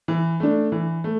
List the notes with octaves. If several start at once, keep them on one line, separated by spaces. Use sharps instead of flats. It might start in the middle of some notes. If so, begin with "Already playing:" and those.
E3
A3 D4
E3
A3